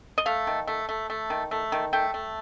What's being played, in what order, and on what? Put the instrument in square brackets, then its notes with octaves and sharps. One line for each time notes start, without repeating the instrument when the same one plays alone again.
[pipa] D#5
A3 F5
D#3
A3
A3
A3
D#3
A3
D#3
A3 G5
A3